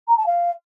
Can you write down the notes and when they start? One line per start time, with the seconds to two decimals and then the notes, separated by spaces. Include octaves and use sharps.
0.08 A#5
0.17 A5
0.26 F5